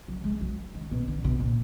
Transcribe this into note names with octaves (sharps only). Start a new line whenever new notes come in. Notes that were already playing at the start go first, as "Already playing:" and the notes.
F#3
G#3
F#3
D#3
B2
D3
B2
A#2